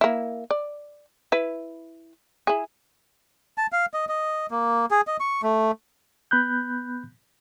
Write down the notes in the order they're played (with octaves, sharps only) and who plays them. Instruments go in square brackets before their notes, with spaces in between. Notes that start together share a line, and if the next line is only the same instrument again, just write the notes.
[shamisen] A#3 E4
D5
E4 B4
E4 G#4
[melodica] A5
F5
D#5
D#5
A#3
G#4
D#5
C#6
A3
[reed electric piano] B3 B5 F#6 G6